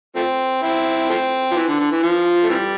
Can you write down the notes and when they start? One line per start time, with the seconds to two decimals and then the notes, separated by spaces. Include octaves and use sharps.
0.16 F3 A3 C4
0.63 C4 E4
1.10 F3 A3 C4
1.52 F3
1.56 E3
1.68 D3
1.80 D3
1.92 E3
2.03 F3
2.43 A3
2.50 C3 E3 G3